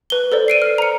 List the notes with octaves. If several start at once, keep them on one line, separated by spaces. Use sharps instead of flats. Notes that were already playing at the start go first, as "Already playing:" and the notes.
B4 G7
A4 C5 D5
C7 D7 D#7
F6
A#5 C#7